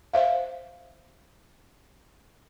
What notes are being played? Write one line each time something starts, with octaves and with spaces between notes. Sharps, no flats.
C5 E5 F5